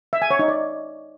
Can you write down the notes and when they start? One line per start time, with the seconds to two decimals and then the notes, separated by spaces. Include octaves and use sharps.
0.13 E5
0.22 G#5
0.31 C#5
0.39 D#4
0.48 D5